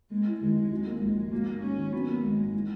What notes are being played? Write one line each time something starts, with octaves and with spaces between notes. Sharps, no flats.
G#3 A#3
E4
D#2 G#3
D#3
F#3
A#3
A#1 G#3
G#2
F#3 A#3
G#2
G#2 C#4
D#3
F#3 B3
A#3
G#1 G#3
G#2
E3